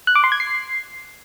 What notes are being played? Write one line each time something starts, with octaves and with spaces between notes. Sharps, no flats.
F#6
D6
C6
G#6
C7